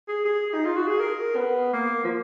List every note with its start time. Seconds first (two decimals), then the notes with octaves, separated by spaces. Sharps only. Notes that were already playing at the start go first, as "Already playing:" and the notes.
0.08 G#4
0.25 G#4
0.54 D#4
0.66 F4
0.76 F#4
0.88 G#4
1.00 A#4
1.36 B3
1.73 A#3
2.04 F3